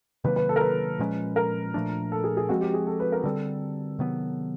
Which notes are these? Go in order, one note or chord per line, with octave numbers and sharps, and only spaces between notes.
C3 D#3 F#3 A#3 B4
B4
A4
A#4
B4
A#2 F3 G#3 C#4
A#4
A#2 F3 A3 D4
A4
G#4
G#4
F3 G#3 C4 F#4
G4
G#4
A4
B4
A#4
D3 G3 C4 A4
C3 D#3 F#3 B3